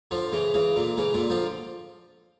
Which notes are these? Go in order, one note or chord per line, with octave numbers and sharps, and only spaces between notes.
D3 F3
C#3 E3
C#3 E3
A#2 D3
C#3 E3
A#2 D3
D3 F3